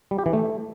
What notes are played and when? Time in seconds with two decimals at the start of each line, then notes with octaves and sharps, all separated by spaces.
0.11 G3
0.18 G4
0.26 E3
0.33 A3